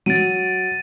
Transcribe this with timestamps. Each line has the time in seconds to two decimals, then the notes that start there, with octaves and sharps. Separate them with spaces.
0.06 F#3 A6 D7 D#7